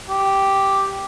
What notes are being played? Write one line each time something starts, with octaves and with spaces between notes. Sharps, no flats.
G4